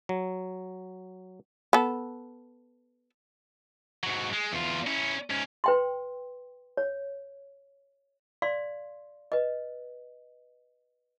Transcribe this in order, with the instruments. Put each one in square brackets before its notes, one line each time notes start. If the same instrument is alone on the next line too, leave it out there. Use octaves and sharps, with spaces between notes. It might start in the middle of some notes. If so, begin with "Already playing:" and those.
[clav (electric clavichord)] F#3
[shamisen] B3 A4
[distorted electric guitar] G#2 F#3
G#3
E2 F4
C#4 E4
G#2 C#4
[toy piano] B4 G5 C6
C#5
D5 F5 C6
B4 D#5